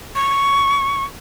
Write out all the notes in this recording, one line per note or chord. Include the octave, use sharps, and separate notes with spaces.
C#6